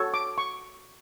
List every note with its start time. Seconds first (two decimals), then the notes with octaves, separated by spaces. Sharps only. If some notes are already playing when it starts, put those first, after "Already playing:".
Already playing: F#4 A4 C#5
0.14 D6
0.38 C#6